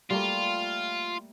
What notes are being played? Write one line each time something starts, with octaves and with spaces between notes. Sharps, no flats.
G3 A3 A#3 F4